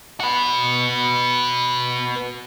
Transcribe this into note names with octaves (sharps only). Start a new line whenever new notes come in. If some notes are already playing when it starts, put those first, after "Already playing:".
F#4 B4